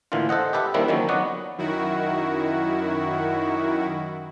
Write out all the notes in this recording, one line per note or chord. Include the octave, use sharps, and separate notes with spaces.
A2 D3 E3 A#3 F4
A4 C5 D#5 F#5
G4 A4 B4 E5 F#5
D#3 G3 A#3 C4 D4 E4
D3 D#3 F3 F#3 A#3 C#4
F#3 B3 F#4 D5 D#5 F#5
F#2 D#3 E4 F#4